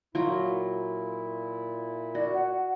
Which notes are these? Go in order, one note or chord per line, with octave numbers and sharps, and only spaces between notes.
A#2 F#3 E4 F4
F#4 D5
F#5